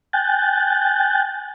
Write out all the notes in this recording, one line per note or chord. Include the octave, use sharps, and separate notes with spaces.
G5 G#5 F#6 G6 A6